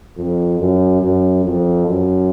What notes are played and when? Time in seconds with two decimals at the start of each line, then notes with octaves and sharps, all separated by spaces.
0.17 F2
0.60 F#2
1.02 F#2
1.44 F2
1.87 F#2